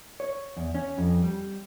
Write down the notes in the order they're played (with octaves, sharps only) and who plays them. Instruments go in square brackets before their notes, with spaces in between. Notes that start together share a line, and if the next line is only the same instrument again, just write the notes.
[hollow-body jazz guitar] C#5
E2
C#4
F2
G3